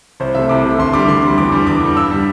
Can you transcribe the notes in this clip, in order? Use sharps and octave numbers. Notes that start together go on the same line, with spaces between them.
C2 C5
C3 A3 E5
C2 D6
C3 A3
D2 C6
D3 G3 D6
D2 C6
D3 G3
E2 D6
D3 G3
E2 D6
D3 G3
G2 E6
D3 G3